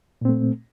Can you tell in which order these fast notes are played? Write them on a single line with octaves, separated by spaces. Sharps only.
A#2 C4 A3